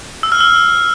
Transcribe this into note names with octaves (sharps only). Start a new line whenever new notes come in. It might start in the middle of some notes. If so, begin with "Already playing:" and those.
E6
F6
E6